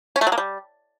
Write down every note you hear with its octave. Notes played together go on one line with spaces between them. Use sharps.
C#4
A3
F#3
A#3
G3